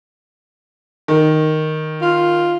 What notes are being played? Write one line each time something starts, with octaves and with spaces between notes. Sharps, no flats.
D#3
F4